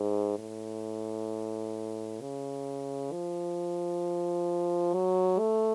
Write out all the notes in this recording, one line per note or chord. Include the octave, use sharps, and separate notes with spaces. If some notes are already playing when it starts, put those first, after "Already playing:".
Already playing: G#2
A2
C#3
F3
F#3
A3